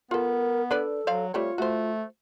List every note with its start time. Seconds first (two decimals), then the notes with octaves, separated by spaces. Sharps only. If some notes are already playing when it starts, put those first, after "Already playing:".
0.11 B3 F4 A4 A#4
0.71 D4 A4 B4 D5
1.07 F#3 C5 D5 F5
1.34 G3 A3 C4 F4 C#5
1.58 A3 F#4 C5